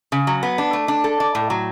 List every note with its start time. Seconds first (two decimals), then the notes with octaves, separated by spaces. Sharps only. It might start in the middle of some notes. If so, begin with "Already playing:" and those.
0.12 C#3
0.27 F#3
0.43 B3
0.58 D4
0.73 A3
0.88 D4
1.04 A4
1.20 D5
1.35 A2
1.50 F#3